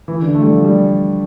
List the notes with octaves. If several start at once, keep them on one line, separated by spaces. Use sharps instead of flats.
E3
D3
A3
G3
F3
G3